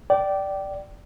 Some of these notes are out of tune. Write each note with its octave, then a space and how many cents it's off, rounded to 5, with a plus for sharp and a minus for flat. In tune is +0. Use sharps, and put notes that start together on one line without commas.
D5 +0 G5 -20